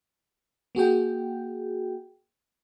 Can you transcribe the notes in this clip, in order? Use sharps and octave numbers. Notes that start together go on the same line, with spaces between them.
A#3 F#4 G#4 G5